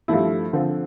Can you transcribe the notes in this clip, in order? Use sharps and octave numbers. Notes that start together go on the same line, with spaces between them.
G2 F3 A3 E4
D3 F3 C4